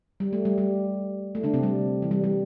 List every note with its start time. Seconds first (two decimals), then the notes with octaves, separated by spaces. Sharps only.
0.20 G3
0.33 A3
0.45 G3
0.58 G3
1.35 A3
1.43 D3 D4
1.54 C3 C4
1.63 G3
2.02 E3
2.11 G3
2.24 G3